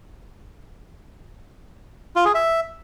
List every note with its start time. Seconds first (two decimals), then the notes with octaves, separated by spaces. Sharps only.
2.16 F4
2.25 G#4
2.35 E5